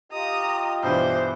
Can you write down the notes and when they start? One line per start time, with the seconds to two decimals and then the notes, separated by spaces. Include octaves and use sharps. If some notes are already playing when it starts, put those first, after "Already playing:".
0.12 F4 G4 D#5 A#5 D#6
0.83 G2 B2 E3 C5